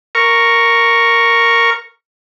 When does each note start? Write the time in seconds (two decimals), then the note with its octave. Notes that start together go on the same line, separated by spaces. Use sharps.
0.15 A#4 C#6